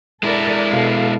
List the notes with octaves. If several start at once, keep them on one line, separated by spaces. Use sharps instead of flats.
G#3 E4 A4 A#4 D5
B2 A4 F5